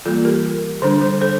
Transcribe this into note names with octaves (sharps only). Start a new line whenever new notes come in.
E3 G3 A#3 F4 A4
G4 A#4
D3 G3 D4 A4 C5
A4 C5
A4 C5